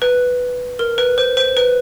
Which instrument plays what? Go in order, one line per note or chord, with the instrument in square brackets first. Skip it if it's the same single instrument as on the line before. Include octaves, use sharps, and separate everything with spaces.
[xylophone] B4
A#4
B4
C5
C5
B4